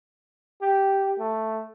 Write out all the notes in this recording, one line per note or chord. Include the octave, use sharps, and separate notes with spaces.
G4
A3